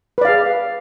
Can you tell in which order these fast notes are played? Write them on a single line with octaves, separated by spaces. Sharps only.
B4 D5 F5 G#4